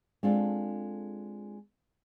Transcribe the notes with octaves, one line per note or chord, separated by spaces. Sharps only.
G#3 C4 D4 F4 A4